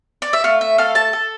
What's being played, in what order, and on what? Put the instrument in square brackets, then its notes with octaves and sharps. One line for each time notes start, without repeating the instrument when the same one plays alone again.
[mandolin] D5
E5
A3 F5
E5
A4 F5
A5
A4